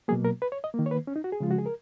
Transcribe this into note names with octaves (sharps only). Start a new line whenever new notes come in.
B2 F#3 A#3 G#4
A#4
B4
C#5
D#5
D#3 A#3
C#5
B4
C#4
D#4
F#4
G#4
C#3 F3 G#3 F4
F#4
G#4
A#4